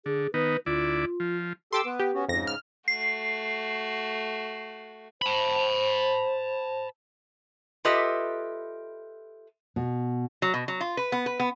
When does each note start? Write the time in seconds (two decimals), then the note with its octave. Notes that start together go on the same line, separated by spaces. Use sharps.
0.06 D3 G#4
0.34 D#3 B3 D#4 B4
0.66 D2 E4 F4 D5
1.20 F3
1.73 G4 A4 C6 D6 E6
1.85 B3 B4
2.00 G4
2.14 B3 C#4 F#4
2.28 F2 G#2 C#3 A#6
2.47 F6
2.88 A3 F#4 C7
5.22 C5 A5 B5
7.85 F4 G4 A4 B4 D#5 E5
9.76 B2
10.42 F#3
10.54 B2
10.68 F#3
10.81 F4
10.97 B4
11.12 B3
11.26 B4
11.40 B3